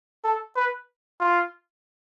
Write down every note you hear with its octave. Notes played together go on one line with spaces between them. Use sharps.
A4
B4
F4